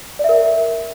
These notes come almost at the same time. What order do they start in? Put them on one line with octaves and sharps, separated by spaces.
D5 E5 A#4